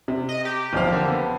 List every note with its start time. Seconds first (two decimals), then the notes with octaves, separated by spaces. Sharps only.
0.08 C3
0.29 D#5
0.45 G4
0.73 F#1 B1 F2 C5 F5
0.93 D3 A#3
1.08 B3